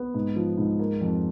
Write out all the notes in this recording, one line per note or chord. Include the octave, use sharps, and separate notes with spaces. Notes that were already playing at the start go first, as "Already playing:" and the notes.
Already playing: B3
G#2
F3
G#2
A#3
F2